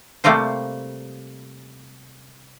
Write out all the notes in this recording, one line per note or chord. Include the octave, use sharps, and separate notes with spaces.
C3 G3 A3 A#3 F4 C5